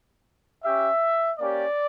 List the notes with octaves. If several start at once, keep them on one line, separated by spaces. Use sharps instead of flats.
C#4 G4 E5
A#3 C#4 G4 D5